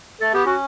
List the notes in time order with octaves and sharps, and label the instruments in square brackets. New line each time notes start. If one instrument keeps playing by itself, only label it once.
[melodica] A3 [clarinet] A4
[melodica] B3 [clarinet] G4
[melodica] C#4 [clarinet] F#4